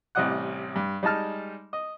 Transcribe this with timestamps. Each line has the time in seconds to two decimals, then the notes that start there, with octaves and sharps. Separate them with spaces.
0.15 A1 C3 G3 D#5 F#5 F#6
0.76 G2
1.03 G3 G#3 D#4 A5 F6
1.73 D#5